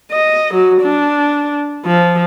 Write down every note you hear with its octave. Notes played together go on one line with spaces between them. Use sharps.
D#5
F#3
D4
F3